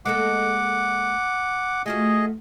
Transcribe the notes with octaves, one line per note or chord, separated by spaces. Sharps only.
G#3 A#3 A4 F#5 D6
A3 F4 F#4 G#4 D#5